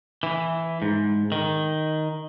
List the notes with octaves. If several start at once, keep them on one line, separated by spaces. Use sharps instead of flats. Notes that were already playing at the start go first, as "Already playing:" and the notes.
E3
G#2
D#3